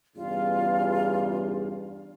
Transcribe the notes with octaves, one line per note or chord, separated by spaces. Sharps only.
E2 G2 C#3 F4